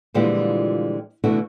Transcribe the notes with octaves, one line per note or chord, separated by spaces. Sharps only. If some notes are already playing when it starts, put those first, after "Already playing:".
A#2 D3 E3 F3 G3 G#3
B2 D3 E3 A3 E4 F#4